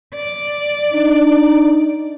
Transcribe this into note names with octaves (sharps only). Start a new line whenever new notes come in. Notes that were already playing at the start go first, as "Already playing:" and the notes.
D5
D4 D#4